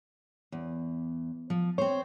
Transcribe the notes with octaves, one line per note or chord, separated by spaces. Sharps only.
E2
F3
C4 C5 C#5